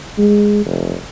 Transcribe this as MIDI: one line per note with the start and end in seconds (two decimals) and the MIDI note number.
0.18 0.62 56
0.66 0.95 29